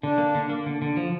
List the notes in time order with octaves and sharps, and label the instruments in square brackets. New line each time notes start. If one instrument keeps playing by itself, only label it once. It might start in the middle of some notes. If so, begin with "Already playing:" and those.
[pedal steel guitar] D3 [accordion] D4
[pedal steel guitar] A#3
D3
A#3
D3
D3
F3